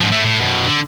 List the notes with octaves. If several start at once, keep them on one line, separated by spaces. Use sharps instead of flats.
G#2 F3
A3 E4
A2
F#2 B2
D3